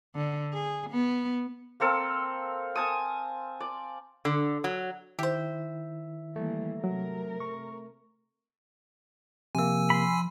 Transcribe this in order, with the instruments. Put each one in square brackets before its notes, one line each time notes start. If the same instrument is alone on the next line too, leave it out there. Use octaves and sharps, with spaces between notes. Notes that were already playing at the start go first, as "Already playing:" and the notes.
[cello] D3
G#4
B3
[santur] A#3 C4 A4 F5
G#5 A5 D#6
D5
[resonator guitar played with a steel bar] D3
F#3
[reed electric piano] D#3 E4 [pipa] G4 C5 [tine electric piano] E5
[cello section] E3 G3 A#3 [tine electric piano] A3
[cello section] C3 A#4 [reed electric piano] F#3
[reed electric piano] C#6
[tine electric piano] C3 A#3 [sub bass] F3 [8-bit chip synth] G#5 E6
[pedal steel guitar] B5 C6